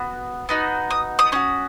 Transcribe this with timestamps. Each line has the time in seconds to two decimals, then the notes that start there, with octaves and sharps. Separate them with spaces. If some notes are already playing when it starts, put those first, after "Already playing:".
Already playing: B3 F#4
0.49 B3 D#4 F#4
0.90 D#6
1.19 D#6
1.32 C#4 F#4 D#6